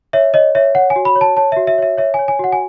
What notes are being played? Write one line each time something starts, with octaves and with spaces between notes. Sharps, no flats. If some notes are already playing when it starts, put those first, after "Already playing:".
C#5 E5
C#5 D#5
C#5 E5
C#5 F#5
G#5
F#4
B5
C#5
A5
C#5 A5
F#4 E5
E5
C#5 E5
C#5 E5
G#5
C#5
G#5
F#4 F#5
G#5